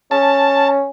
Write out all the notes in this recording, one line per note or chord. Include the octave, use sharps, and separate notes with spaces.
C#4 A5